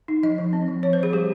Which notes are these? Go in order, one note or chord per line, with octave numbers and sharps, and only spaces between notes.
D#4
F3 D#5
F3
C4
F3
F3 C#5
C5
F3 G#4
G3 G4